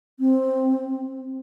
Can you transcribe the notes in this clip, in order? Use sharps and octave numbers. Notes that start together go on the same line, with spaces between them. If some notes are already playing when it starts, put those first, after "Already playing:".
C4